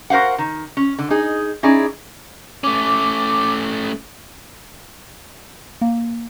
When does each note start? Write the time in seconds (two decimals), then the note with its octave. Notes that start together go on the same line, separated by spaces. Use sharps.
0.10 F#4 A#4 C5 F5 F#5
0.38 D#3
0.77 C#4
0.99 D3
1.10 D#4 G#4
1.63 C#4 D#4 E4 G#4 D5
2.64 A3 C#4 D6
5.81 A#3